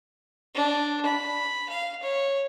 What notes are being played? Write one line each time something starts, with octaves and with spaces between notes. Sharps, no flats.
D4
B5
F5
C#5